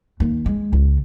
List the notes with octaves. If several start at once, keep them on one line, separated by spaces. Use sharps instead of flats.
D#2
G#3
C#2